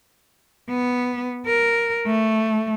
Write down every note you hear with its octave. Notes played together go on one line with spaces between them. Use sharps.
B3
A#4
A3